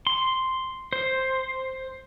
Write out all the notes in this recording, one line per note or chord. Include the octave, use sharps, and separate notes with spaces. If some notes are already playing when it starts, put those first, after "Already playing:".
C6
C5